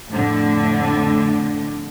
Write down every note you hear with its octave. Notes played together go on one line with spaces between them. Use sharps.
F2 A2 D3